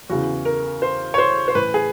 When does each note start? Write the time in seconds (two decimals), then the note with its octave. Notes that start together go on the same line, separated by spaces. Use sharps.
0.10 E2 C#3 E3 F#4
0.45 A#4
0.82 C5
1.14 C#5
1.18 C5
1.48 C5
1.55 A2 E3 B4
1.74 G#4